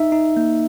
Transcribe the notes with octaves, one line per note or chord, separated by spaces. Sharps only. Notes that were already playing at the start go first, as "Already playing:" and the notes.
Already playing: D#4 E5
D#4
A#3